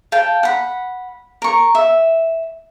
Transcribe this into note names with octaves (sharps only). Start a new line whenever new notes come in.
F5 G5 A5
F#5 B5
A#4 C#6
E5